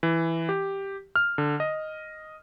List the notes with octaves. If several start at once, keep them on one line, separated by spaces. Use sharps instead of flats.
E3
G4
F6
D3
D#5